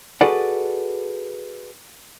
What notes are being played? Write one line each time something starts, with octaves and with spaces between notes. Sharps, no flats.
F#4 G#4 A4 B4 D5 F#5